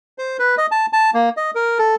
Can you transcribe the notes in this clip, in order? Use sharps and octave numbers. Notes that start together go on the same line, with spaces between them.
C5
B4
D#5
A5
A5
A#3
D#5
A#4
A4